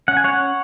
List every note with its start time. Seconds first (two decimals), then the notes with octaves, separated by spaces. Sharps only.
0.08 C#4 F#5
0.17 G#5
0.24 C#5 F#5
0.33 C#4